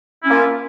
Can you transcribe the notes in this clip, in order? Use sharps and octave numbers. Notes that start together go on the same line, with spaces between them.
A#3 C#4 E4 F4